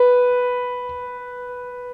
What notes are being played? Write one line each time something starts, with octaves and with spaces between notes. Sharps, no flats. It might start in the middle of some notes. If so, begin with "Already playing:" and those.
Already playing: B4